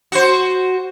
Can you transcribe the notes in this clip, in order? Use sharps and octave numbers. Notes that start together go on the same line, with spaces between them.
F#4 C5